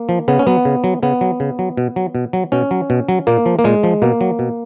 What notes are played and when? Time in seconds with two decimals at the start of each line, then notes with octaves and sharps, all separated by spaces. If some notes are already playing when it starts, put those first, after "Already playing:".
Already playing: A#3
0.09 F3
0.28 C#3 B3
0.39 C#4
0.47 F#3 B3
0.65 C#3
0.84 F#3
1.03 C#3 B3
1.21 F#3
1.40 C#3
1.59 F#3
1.77 B2
1.96 F#3
2.15 B2
2.33 F#3
2.52 B2 C#4
2.71 F#3
2.90 B2
3.09 F#3
3.27 A#2 A#3
3.46 F3
3.59 A#3
3.64 A#2 G#3
3.83 F3
4.02 B2 A#3
4.21 F#3
4.39 B2